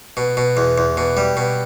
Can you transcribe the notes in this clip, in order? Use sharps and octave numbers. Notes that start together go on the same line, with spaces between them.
B2
B2
E2
E2
B2
G3
B2